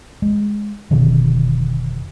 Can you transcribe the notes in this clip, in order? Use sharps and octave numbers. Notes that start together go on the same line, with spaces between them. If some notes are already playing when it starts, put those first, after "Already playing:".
G#3
F1 B2 D3 D#3